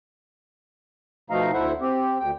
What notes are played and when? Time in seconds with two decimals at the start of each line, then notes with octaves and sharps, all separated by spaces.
1.30 B2 F3 A3 D#4 F5 A#5
1.53 D2 E4 A4 C5 E5 F#5
1.81 C4 G4
2.20 D2 G5